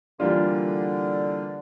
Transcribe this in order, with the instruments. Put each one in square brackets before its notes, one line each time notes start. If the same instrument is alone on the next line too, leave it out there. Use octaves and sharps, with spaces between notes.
[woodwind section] D3 [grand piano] E3 G3 A#3 D4 F4